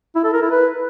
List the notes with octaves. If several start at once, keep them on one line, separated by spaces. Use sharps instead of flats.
E4
A4
A#4
E4
B4